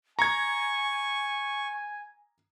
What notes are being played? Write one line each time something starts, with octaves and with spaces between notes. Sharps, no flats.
G#5 A#5 C#6 G#6